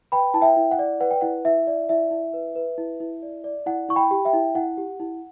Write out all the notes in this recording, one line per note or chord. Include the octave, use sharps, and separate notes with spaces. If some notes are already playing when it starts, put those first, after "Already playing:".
B4 G5 B5
E4 A5
E5 G5
E4
F#5
D5
B4 F#5
G5
E4 F#5
E4 E5
D5
E4 E5
E4
B4
B4
E4
E4
D5
D5
E4 F#5
E4 C#6
G5 B5
G4
E5 G5
E4
E4 F#5
G4
E4